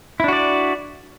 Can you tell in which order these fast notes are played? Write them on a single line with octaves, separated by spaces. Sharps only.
E4 D4 F#4 D5